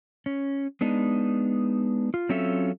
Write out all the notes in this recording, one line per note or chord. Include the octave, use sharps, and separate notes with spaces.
C#4
G#3 B3 D4 D#4
F4
F#3 C4 C#4 F4 A4 E5